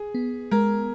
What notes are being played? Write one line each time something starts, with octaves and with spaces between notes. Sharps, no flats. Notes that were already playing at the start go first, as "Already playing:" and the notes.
Already playing: G#4
B3
G#3 A#4